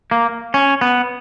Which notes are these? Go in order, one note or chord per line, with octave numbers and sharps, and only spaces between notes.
A#3
C#4
B3